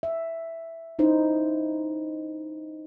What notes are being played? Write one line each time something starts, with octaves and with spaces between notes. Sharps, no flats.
E5
C#4 D#4 E4 C5